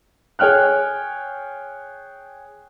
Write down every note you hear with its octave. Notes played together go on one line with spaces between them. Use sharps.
G#4 C#5 G5 F6 F#6